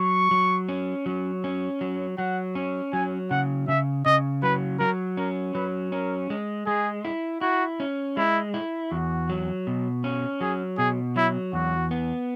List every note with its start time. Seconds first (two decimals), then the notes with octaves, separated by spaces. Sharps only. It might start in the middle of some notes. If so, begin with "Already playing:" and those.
Already playing: F#3 C#6
0.31 F#3
0.69 C#4
1.06 F#3
1.44 C#4
1.81 F#3
2.18 F#3 F#5
2.55 C#4
2.93 F#3 G#5
3.31 C#3 F#5
3.68 C#3 E5
4.06 C#3 D#5
4.43 F#3 B4
4.80 F#3 A#4
5.17 C#4 A#4
5.54 F#3 B4
5.92 C#4 A#4
6.30 G#3
6.67 G#3 G#4
7.05 E4
7.41 E4 F#4
7.80 C#4
8.17 G#3 E4
8.54 E4
8.91 E2 F#4
9.29 F#3
9.67 B2
10.04 C#4
10.41 F#3 G#4
10.78 B2 G#4
11.16 F#3 E4
11.53 E2 F#4
11.91 B3